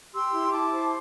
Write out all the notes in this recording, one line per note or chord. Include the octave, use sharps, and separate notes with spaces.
G4 C6 E6
E4
E4 A5 D6
C5